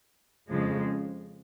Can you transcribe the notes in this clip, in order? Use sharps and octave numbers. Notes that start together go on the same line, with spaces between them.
F2 C#3 F3 G#3